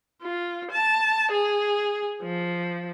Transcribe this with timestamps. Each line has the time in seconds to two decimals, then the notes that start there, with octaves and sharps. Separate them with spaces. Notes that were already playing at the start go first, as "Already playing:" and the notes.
0.22 F4
0.71 A5
1.32 G#4
2.23 F3